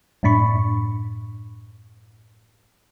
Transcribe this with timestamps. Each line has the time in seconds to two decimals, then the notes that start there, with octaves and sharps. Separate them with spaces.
0.23 F#2 A2 D4 B5 C#6